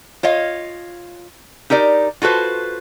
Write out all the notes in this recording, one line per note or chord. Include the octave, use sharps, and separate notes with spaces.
F4 C#5 D#5 F5
D#4 G4 A#4 D5
F4 F#4 A4 B4 C5